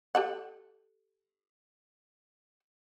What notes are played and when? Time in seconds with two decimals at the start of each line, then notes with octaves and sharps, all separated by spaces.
0.15 G4 A4 F#5